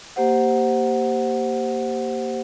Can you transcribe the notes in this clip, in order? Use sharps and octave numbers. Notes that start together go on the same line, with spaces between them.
A#3 G4 C5 F#5